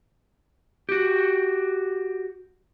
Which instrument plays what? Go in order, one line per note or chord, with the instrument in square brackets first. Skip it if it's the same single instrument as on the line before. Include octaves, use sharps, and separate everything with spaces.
[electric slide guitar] F#4 G4